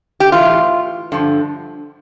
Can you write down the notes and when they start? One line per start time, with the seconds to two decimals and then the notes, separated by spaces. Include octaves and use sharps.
0.20 G4
0.32 A2 E3 F4
1.12 G2 D3 F3